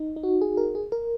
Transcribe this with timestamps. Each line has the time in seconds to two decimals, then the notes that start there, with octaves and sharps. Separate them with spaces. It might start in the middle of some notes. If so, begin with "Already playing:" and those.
Already playing: D#4
0.16 D#4
0.23 F#4
0.41 G#4
0.57 A#4
0.75 G#4
0.92 A#4